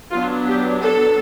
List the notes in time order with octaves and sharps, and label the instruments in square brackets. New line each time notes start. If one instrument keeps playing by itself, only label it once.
[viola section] F#3 B3 D4 F4
G4
A4